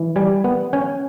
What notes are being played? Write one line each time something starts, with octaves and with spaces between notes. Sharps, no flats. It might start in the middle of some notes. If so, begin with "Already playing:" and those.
Already playing: E3
G3 G#5
B3
C#4 G#5